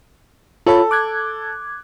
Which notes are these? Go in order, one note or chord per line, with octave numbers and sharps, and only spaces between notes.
F4 A4 C#5 B5
D6 F#6 G#6